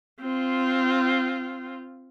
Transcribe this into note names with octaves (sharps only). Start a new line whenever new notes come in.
C4 F4